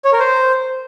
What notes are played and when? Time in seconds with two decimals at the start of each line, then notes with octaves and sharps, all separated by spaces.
0.05 C#5
0.12 A#4
0.20 C5